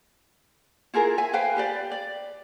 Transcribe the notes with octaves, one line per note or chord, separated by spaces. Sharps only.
E4 F4 G#4 A#4
E5 G#5
B4 C5 F5 G5
G4 B4 D5
D5